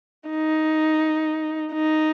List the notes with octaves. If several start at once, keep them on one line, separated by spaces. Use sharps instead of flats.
D#4
D#4